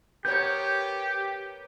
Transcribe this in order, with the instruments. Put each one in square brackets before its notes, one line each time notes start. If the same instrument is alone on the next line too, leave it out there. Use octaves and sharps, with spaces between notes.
[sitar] B3 A#4 C#5 [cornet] G4 [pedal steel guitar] G6